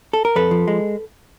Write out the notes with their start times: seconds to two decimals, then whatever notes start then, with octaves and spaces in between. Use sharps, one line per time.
0.13 A4
0.25 A#4
0.36 F2 A4 B4
0.51 F3
0.68 G#3